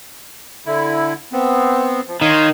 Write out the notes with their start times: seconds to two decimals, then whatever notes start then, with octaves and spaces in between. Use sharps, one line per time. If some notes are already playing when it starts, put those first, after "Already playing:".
0.66 D3 E4
1.33 B3 C4
2.08 F3
2.22 D#3 C#5 F5 C6